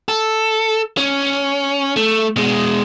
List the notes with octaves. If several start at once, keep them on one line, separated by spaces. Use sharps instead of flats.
A4
C#4
A3
B2 G#3